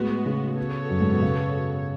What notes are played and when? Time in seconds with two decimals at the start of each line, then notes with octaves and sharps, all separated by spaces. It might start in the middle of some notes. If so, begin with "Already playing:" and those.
Already playing: A2 G#3 B3 F#4
0.26 C#3
0.57 B3 F#4 A4 C#5
0.90 F#2
1.01 G#2
1.11 B2
1.22 C#3